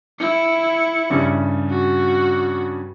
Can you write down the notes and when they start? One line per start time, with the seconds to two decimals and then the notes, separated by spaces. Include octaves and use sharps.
0.20 E4 C#7
1.10 G2 C#3 G3
1.70 F#4